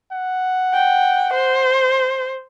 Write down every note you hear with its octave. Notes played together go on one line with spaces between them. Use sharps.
F#5
G5
C5